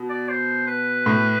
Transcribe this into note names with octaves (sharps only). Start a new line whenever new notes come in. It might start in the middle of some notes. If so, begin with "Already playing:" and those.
Already playing: B2
D5
C5
B4
A2